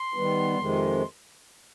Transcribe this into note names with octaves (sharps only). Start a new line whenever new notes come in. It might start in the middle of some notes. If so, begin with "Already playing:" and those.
Already playing: C6
D#3 G3 B3
F2 C3 D#3 G#3